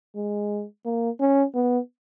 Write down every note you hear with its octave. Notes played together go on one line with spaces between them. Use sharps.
G#3
A#3
C#4
B3